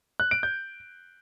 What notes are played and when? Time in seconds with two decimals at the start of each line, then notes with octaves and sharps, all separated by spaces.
0.20 F#6
0.31 D7
0.43 G6